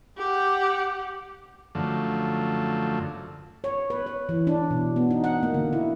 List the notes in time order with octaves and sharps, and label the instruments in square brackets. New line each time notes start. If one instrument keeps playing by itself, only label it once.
[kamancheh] G4 F#5
[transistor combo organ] F#2 D3 F3 A3
[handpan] C#5
B4
C#5
E3
D4
B2
B3
D#4
F#5
A#3
D3
E4